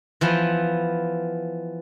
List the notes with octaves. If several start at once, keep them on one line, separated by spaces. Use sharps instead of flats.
E3 F3 B3